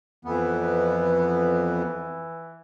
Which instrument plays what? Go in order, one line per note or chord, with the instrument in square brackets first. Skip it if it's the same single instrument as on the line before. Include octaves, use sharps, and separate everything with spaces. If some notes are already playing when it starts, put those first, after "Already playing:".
[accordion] F2 B3 [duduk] E3